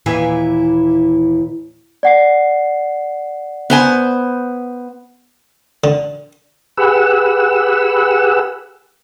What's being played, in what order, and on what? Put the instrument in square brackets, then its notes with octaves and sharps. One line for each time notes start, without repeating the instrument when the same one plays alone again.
[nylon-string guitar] D#2 A#2 E3 E4 F5 G#5
[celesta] D5 F#5 C7
[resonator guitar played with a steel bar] B3 C5 G#5
[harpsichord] D3
[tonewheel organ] G4 G#4 B4 F#5 E6